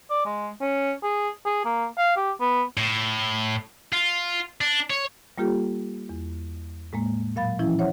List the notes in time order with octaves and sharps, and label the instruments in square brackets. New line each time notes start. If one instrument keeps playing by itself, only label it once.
[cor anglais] D5
G#3
C#4
G#4
G#4
A#3
F5
G4
B3
[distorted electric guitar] A2
F4
D4
C#5
[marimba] G3 A#3 F4 G4 A4
E2
A2 G#3 A#3
A#2 F#3 F5 B5 A6
E3 F3 C#4 E4
C5 C#5 E5 F#5